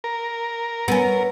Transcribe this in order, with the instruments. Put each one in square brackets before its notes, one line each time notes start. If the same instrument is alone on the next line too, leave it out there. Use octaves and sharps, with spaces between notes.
[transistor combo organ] A#4
[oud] B3 C#4